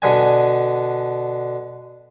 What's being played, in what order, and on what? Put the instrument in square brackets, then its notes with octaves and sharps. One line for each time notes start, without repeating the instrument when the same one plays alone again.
[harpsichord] B2 D3 G#5